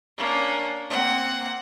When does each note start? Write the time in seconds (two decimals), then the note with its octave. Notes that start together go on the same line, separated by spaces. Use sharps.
0.18 A#3 C#4 D4
0.90 A#3 C4 F#5